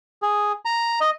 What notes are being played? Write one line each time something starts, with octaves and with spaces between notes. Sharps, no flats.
G#4
A#5
D#5